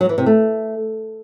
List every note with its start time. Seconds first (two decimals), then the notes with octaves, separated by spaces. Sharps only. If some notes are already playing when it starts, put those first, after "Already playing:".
0.01 F#3
0.09 E3
0.18 C3
0.26 A3